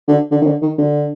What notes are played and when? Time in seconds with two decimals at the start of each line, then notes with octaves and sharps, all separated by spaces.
0.08 D3
0.31 D3
0.41 D#3
0.47 D3
0.62 D#3
0.78 D3